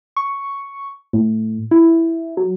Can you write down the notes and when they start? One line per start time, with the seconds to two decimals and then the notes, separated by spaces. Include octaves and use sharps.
0.17 C#6
1.13 A2
1.71 E4
2.37 F#3